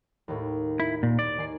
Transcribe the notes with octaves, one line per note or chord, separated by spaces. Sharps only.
D#2 A2
E4 B5
A#2
D5
D#3 G#5 C7